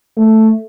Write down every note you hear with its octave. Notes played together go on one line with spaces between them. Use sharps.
A3